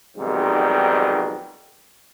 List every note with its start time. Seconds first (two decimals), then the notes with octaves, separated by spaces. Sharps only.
0.17 B1 F2 G#2 C3 D#3 G3